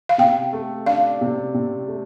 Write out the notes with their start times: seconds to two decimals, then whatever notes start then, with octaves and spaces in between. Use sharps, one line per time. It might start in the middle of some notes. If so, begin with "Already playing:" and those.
0.09 F5
0.18 C3 G5
0.53 A3
0.86 D4 F5
1.21 C3
1.54 C3
1.88 A3